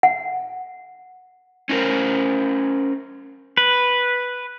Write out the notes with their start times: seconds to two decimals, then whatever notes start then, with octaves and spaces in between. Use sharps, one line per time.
0.03 F#5
1.69 C#4 D#4 F#4 A#4 C5
3.57 B4